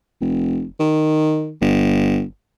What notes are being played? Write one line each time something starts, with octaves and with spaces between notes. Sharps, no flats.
F1
D#3
G1